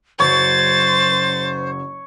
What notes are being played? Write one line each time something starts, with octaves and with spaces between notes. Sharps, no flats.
F#1 F#2 F#3 C5 C#5 A6